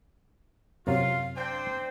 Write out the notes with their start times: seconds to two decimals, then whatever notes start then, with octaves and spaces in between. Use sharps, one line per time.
0.87 F#2 C3 F#3 F4 F5
1.36 C4 D4 C5 G5